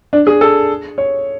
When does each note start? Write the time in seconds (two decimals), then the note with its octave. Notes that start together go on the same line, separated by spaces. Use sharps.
0.13 D4
0.27 G#4
0.41 A4
0.98 C#5